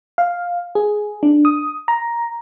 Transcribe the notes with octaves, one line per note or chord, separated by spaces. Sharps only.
F5
G#4
D4
D#6
A#5